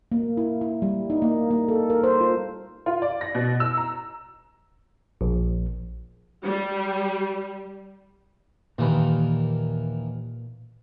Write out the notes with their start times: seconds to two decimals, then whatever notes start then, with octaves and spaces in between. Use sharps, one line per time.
0.12 A#3
0.37 E4
0.61 E4
0.82 G3
1.10 D#4
1.22 A#3
1.50 A#3
1.68 A4
1.90 A#4
2.04 C5
2.21 F4
2.86 F4
3.02 D5
3.21 A#6
3.35 B2
3.60 E6
3.77 A#5
5.21 A#1
6.44 G3
8.78 D#2 A#2 D#3 E3 B4